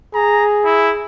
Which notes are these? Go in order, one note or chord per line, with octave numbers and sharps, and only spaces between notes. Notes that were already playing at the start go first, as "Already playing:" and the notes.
G#4 A#5
E4